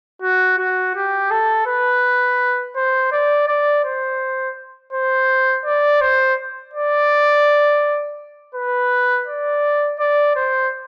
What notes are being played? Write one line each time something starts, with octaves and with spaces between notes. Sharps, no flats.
F#4
F#4
G4
A4
B4
C5
D5
D5
C5
C5
D5
C5
D5
B4
D5
D5
C5